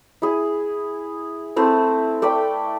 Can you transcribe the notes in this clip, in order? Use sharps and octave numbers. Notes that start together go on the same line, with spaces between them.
E4 G#4
A3 C4 E4
A3 D5 G5 B5